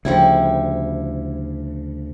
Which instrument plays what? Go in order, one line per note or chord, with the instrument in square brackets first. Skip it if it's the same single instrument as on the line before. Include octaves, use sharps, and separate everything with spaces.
[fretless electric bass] D2 C#3 [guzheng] F3 G3 E4